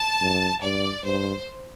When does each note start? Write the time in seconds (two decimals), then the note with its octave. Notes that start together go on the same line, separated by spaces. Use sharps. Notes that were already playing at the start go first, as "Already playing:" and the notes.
Already playing: A5
0.21 F#2
0.62 G2 D5
1.04 G2 C5